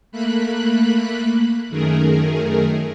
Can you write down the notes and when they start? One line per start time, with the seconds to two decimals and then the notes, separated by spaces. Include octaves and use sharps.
0.12 A3 A#3 B5 F#6
1.69 F#2 D#3 A3 G#4 A#4